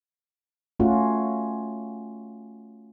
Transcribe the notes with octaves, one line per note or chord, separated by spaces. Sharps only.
A3 C#4 F4 F#4